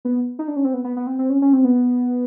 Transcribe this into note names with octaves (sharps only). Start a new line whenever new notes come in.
B3
D#4
D4
C#4
C4
B3
B3
B3
C4
C4
C#4
C#4
C4
B3